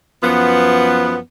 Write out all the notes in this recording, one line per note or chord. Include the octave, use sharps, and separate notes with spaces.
F#2 F3 B3